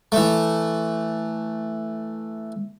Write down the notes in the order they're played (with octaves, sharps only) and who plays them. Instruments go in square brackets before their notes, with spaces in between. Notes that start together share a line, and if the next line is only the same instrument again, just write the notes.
[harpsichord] E3 A3